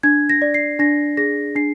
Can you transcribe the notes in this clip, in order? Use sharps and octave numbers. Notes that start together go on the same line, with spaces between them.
D4 G#6
A#6
D5
C7
D4 A#6
G#4 A#6
D4 C7